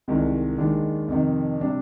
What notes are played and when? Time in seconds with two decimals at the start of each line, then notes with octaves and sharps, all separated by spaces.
0.08 C2 C3 D#3 G#3
0.58 D#2 D#3 G#3 D4
1.08 F2 C3 D#3
1.59 C3 G3 D4